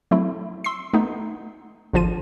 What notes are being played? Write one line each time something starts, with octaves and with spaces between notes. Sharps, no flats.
F#3 A3 C4 E4
C6 E6 C7
A3 B3 D#4
G#1 D3 F3 F4 D#7